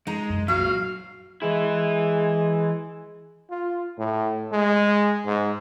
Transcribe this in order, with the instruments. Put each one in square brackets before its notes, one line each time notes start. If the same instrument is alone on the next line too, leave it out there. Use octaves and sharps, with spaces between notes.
[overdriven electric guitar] G#3 [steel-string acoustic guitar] D#4 A#5
[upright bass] C2 F#2
[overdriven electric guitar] A#2 F#3 [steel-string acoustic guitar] F#4 [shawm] F5
[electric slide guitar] E3 E4 [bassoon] G#3
[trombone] F4
A2
G#3
G#2